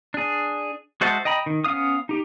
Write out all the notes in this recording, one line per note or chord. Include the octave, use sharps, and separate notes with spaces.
D4 G#4
G#3 F#4 C5 E5 A5
D#5 G5 A#5 B5
D#3
B3 C#4 F5 D#6
D#4 G4